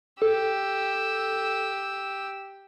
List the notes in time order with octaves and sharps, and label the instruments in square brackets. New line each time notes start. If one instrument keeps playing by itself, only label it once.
[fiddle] G4 E6 [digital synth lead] A4